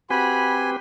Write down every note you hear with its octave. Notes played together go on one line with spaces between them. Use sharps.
C4 F#4 G4 B4 G#5 B5